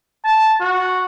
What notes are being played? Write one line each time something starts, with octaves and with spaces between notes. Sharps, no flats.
A5
F#4